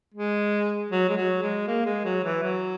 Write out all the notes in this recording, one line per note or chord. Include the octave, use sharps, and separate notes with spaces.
G#3
F#3
G#3
F#3
G#3
A#3
G#3
F#3
E3
F#3